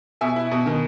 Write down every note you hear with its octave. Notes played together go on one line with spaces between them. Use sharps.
B2 E5 G#5
E4
B2
D#3